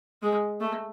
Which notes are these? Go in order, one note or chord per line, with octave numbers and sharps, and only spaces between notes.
G#3
A3